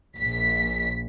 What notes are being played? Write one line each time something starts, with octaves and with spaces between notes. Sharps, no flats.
A#1 B6